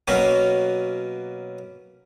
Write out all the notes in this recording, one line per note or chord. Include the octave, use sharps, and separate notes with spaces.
B2 F#3 A#3 C#4